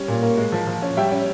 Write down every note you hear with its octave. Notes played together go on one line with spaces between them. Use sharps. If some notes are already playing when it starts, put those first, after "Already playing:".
Already playing: G3 C#4 C#5
A#2
A#3
G#3
F3
F3
C#4
G3 E5 G5
C#4